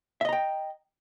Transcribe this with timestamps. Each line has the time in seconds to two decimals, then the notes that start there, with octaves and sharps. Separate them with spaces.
0.21 E5
0.25 D#5
0.29 A#5
0.33 G5